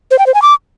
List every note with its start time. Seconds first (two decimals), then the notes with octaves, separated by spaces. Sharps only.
0.11 C5
0.19 G5
0.27 C5
0.34 G#5
0.42 D6